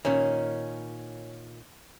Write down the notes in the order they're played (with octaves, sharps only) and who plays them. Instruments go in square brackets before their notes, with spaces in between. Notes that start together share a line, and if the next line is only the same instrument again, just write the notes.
[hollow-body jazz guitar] A#2 D#3 [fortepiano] C#4